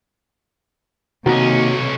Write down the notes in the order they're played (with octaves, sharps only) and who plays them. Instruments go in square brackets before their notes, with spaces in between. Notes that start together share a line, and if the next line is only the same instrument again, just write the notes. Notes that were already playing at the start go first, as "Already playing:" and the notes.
[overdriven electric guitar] B1 C#4 [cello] C3 [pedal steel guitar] D#3 A#3 D#5 [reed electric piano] F#4